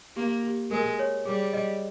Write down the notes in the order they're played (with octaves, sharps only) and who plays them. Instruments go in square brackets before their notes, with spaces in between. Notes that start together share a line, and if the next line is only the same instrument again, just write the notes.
[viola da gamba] A#3 [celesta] G4
[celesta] G4
[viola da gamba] G#3 [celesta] A#4
[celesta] C#5
[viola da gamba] G3 [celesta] G#4
[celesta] D#5